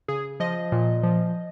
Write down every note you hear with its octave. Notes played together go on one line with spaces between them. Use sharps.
C#3 G#4
F3 D#5
A#2
F3